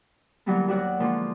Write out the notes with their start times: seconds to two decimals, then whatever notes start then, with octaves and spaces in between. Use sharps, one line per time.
0.46 D3 E3 F#3 G3 A#3 B3
0.68 D#2 F#3 F#4 D5 F#5
1.00 D3 E3 F3 G#3 A#3